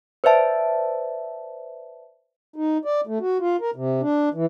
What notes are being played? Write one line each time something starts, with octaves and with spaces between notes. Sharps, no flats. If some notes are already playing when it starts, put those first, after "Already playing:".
B4 C5 D5 E5 A5
D#4
D5
A3
F#4
F4
A#4
C3
D4
E3